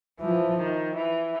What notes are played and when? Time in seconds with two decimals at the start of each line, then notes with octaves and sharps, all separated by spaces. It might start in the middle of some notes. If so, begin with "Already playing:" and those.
0.20 E3 F3
0.58 D#3
0.96 E3